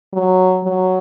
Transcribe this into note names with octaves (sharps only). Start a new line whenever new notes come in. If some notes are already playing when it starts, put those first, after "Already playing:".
F#3
F#3